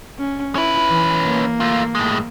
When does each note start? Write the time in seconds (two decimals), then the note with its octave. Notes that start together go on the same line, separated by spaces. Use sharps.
0.18 C#4
0.55 C#4 E4 B4
0.90 E3
1.24 A#3
1.60 A3 F4
1.95 A2 G#3